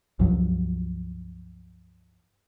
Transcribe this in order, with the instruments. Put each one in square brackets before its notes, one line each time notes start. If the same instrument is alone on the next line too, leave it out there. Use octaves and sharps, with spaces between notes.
[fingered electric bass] C#2 G2 F3 F#3